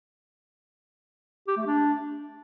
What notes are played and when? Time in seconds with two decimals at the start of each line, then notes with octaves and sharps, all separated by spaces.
1.48 G4
1.57 A3
1.66 D4